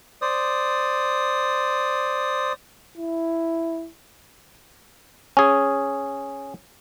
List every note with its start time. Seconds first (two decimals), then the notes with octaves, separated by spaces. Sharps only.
0.22 C5 D5 D#6
2.97 E4
5.37 C#4 G#4